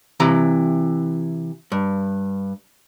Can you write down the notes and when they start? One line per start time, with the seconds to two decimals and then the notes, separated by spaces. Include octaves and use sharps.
0.20 C3 E3 A#5
1.72 G2